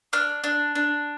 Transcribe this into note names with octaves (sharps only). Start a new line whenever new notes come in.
D4 F6
D4
D4